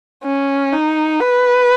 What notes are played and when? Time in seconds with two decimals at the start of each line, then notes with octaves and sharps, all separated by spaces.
0.24 C#4
0.72 D#4
1.20 B4